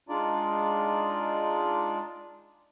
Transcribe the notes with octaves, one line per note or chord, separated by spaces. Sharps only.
G#3 D4 D#4 F4 D5